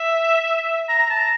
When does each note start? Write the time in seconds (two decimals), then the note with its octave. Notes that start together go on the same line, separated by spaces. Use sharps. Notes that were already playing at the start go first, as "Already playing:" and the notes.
Already playing: E5
0.88 A#5
0.99 A#5
1.10 A5
1.19 A#5